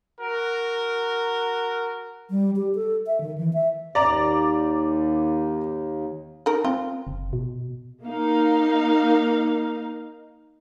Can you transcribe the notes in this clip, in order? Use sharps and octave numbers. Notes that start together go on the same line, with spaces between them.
F#4 A#4
G3
G4
A4
E5
D#3
E3
E5
D#2 D5 A#5 D6
D#3 A#4
C4 F4
F#1
B2
A#3 D#4 F5